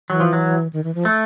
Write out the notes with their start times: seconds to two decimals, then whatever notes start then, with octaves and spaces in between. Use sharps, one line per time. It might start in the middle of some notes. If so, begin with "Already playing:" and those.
0.10 E3 F#3
0.20 F3
0.33 F#3
0.73 D#3
0.84 E3
0.95 F3
1.05 A3